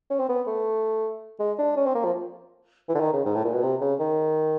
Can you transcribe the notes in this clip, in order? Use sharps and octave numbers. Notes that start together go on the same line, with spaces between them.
C#4
C4
B3
A3
G#3
D4
C#4
C4
A#3
F3
E3
D3
D#3
C#3
G#2
A2
A#2
B2
C3
C#3
D#3